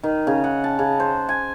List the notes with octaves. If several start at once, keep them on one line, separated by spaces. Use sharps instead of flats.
D#3
C#3
F#5
A5
C#3
C5
G#5